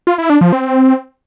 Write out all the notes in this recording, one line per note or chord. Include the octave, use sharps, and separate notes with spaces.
F4
E4
D4
F3
C4